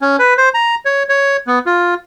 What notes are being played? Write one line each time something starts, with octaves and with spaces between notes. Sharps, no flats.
C#4
B4
C5
A#5
C#5
C#5
B3
F4